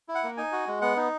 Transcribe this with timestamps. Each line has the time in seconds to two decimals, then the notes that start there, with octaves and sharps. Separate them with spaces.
0.09 E4
0.15 F#5
0.23 A#3
0.37 D#4 G#5
0.52 F#4
0.67 G#3
0.82 B3 F#5
0.96 D#4